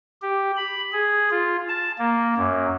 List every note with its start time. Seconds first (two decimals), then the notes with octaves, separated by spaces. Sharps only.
0.22 G4
0.57 B5
0.93 G#4
1.31 F4
1.69 A5
1.98 A#3
2.37 F#2